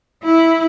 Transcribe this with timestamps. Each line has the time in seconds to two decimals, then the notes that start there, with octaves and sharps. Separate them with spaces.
0.24 E4